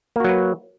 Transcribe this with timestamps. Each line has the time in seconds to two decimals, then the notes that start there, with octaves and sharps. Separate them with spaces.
0.16 A#3
0.20 F#4
0.24 F#3
0.29 B4